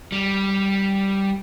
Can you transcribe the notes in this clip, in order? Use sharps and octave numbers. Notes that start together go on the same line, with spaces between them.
G3